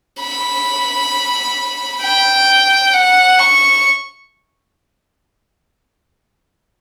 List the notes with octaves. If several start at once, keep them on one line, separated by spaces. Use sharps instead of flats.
B5
G5
F#5
C#6